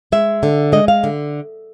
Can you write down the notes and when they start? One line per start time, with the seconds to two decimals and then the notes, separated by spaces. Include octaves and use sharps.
0.12 G#3 E5
0.43 D3
0.72 G#3 D#5
0.88 F5
1.04 D3